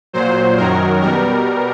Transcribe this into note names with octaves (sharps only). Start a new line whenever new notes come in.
A#2 F#3 C5
F#2 D#3 F#3 A#4
B2 G3 A#4